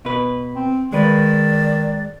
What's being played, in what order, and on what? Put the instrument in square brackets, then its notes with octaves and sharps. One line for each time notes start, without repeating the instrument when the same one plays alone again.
[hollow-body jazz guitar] B2 B4
[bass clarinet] C4
[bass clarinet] D#3 [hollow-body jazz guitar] G#3 B4 [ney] D5